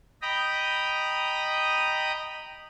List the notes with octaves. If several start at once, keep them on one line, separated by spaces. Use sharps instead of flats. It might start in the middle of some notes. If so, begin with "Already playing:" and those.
D#5 G5 A#5 B5 D#6